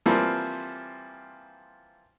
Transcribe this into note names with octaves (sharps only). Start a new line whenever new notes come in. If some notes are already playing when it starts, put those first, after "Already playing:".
E3 F3 G3 A#3 C4